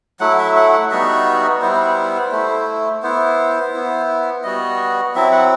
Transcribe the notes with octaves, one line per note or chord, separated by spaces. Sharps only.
F#3 A3 E4 F#5
E5
F#5
F#5
G3 B3 D#4 F#4 E5
G3 B3 E4 C5
A3 E4
B3 E4 C5
B3 E4
G3 B3 F#4 D#5
F#3 C4 E4 E5
F#5